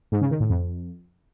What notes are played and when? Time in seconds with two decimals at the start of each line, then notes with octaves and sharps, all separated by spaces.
0.12 G#2
0.21 C#3
0.31 D#3
0.40 A2
0.50 F2